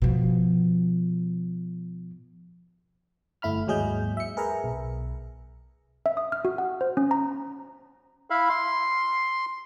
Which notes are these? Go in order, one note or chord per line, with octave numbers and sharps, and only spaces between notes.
B2 F3
G1 A3 E4 B5 F6
D#2 G#2 F#3 G#4 D#5 G6
E5 C#7
G#4 A#4 B4 E5 A#5
B1
E5
D#6
F6
F#4
F#5
C5
C#4
A#5
E4 E5 F5 B5
C6